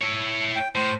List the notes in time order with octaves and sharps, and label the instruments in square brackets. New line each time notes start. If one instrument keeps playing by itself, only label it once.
[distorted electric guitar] E4 C#5
[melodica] G5
[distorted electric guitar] A2 [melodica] C5